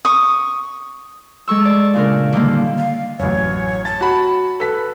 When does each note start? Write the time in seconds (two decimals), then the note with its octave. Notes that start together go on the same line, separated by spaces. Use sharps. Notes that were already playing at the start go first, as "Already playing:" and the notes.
0.05 C#6 D#6
1.48 G#3 A4 C#6 E6
1.65 D5
1.94 A#2 C#3 D4 A#4
2.33 D3 D#3 G3 A#3
2.78 F5
3.19 A1 F#2 C#5
3.85 A5 A6
4.01 F#4 B5
4.60 A4 B4 B6